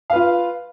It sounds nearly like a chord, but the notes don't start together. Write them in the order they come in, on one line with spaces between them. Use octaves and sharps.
F5 B4 F4